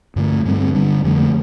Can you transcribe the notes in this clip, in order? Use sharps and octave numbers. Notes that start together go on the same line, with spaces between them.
G2 D3 A3
G2 D3 G3 C4
D3 G3 D4
F2 D3 F3 A3